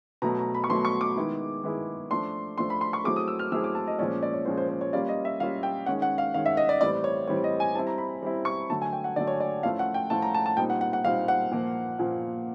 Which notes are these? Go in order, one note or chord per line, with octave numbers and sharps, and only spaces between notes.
B2 F#3 A3 A#5
A#5
B5
C#6
B2 F#3 A3 C6
C#6
D6
D#3 G#3 B3 E4 G#4
D#3 G#3 B3 E4 G#4
F3 A3 D4 C6
F3 A3 D4 C6
B5
C6
C#6
F#3 A3 C4 E4 G#4 D6
D#6
E6
F6
F#3 A3 C4 E4 G#4 E6
D6
A5
D#5
A#2 F3 G#3 C#4 D5
D5
C#5
A#2 F3 G#3 C#4 C5
C5
C5
C#5
G3 A#3 C#4 F4 D5
D#5
E5
G3 A#3 C#4 F4 F5
G5
D#3 G#3 C#4 F#5
F#5
F5
D#3 G#3 C#4 F5
E5
D#5
D5
A2 E3 G3 C4 D5
C#5
A2 E3 G3 C4 C#5
D#5
G#5
G3 C4 E4 A5
A#5
B5
G3 C4 E4
C#6
D3 F#3 A3 A5
G#5
G5
F#5
D3 F#3 A3 D5
C#5
D5
A2 F3 A3 C#4 F4 F5
F#5
G5
A2 F3 A3 C#4 F4 A5
A#5
A5
A5
A#2 G3 C4 D#4 G5
F#5
F#5
F#5
A#2 G3 C4 D#4 F5
F#5
A#2 F3 A#3
A#2 F3 A#3